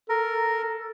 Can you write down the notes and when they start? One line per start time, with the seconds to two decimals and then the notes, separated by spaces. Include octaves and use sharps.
0.09 A4 A#4